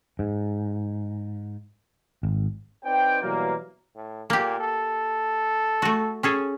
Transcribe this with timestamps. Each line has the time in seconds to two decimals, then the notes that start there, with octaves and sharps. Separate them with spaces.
0.19 G#2
2.23 G#1
2.85 C4 D#4 B4 C5 D5 G5
3.23 B2 E3 F#3 G3 A#3
3.95 A2
4.30 A#2 A#3 G4
4.60 A4
5.82 A3 F#4
6.23 C#4 G#4 A4